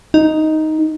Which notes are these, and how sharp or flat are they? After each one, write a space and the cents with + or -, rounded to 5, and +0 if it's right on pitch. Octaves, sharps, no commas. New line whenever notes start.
D#4 +5